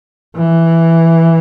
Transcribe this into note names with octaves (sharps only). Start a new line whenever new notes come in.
E3